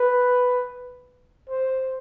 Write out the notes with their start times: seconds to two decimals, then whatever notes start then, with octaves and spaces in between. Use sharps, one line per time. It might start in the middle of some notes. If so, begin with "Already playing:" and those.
Already playing: B4
1.49 C5